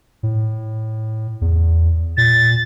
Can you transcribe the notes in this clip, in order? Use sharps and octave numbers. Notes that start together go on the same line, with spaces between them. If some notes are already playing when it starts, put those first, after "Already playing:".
A2
E2
A#2 A6